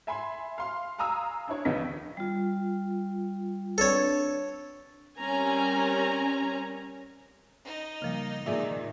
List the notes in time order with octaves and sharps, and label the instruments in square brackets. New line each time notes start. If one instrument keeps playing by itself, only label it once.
[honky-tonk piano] E5 G#5 B5 C6
F5 C6
F5 G#5 A#5 D#6 E6
D4 E4 C#5
A#1 D#2 C#3 B3 D#5 B6
[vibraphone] G3 F4
[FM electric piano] C4 D4 B4 [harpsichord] A4 C#5
[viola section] G3 C4 C#4 A#4 G#5 A#5
[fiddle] D#4 D#5
[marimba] C#3 F3 G3 [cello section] A#3
[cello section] A#2 D#3 [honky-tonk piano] G#4 D5 E5